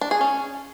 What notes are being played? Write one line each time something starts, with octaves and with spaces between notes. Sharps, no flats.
D4
G#4
C#4